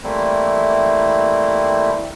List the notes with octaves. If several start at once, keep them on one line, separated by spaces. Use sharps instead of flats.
E3 G3 A3 A#3 C4 E4